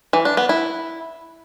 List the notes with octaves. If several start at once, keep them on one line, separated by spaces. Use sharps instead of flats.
E3
D4
B3
E4